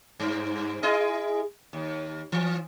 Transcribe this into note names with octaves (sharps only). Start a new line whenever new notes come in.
G2
E4 G#4 D#5
D#2
E3